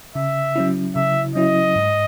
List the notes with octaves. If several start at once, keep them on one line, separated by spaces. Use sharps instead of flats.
C#3 E5
F#3 C#4 E4
C#3 E5
F#3 C#4 E4 D#5
G#2